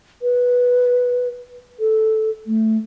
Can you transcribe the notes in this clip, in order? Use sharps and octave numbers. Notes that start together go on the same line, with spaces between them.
B4
A4
A3